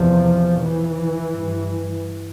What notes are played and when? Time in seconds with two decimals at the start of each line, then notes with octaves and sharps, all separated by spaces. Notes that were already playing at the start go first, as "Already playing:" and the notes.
Already playing: E2 C3 F3
0.61 E3
1.33 G2